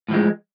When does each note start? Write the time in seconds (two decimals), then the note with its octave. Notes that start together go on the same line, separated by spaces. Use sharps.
0.09 A2
0.11 F3
0.14 G#3